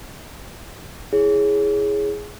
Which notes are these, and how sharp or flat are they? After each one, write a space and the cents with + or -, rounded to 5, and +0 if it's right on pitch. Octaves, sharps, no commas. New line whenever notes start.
E4 +0 G#4 +0 C#5 +0